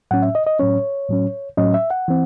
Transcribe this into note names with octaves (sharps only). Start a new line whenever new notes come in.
A2 F#3 C#4 F#5
E5
D#5
D#5
A2 F#3 C#4 C#5
A2 F#3 C#4
A2 F#3 C#4 D#5
E5
F#5
E3 C4